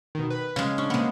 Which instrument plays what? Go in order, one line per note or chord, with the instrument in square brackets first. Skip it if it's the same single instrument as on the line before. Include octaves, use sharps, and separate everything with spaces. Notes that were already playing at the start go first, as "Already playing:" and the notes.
[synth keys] B2 D#3
B4
[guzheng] C#3 G#3 [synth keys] F5
[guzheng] C#4 [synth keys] D4
[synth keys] C3 A#3 [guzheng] G#3 B3